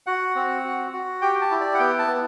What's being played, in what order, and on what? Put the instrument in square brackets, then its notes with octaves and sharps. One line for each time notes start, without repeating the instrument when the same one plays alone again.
[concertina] F#4 F#5
C4
F#4
F#4
G4 G5
A5
E4
D5
F#5
B3 G5
A5
B3